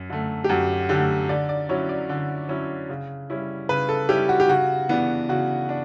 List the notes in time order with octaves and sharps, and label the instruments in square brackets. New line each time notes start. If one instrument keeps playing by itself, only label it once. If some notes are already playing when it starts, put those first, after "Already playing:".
Already playing: [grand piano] F#2
D3 A3
[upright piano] G4
[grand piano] F#2 [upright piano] F#4
[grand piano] D3 A3 [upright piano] G4
[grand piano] D3 [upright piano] D5
[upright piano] D5
[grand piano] F#3 C#4 E4 [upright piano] C#5
[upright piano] D5
[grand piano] D3
F#3 C#4 E4
C#3
G3 C#4 E4
[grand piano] C#3 [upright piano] B4
[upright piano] A4
[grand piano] G3 C#4 E4 [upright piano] G4
[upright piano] F#4
G4
[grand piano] C#3 [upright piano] F#4
[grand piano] E3 B3 D4
[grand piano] C#3 [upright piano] F#4
[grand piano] D4